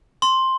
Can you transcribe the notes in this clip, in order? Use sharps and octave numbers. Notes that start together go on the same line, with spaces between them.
C6